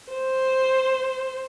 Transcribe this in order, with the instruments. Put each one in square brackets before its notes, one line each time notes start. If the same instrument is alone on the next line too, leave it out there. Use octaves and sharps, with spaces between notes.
[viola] C5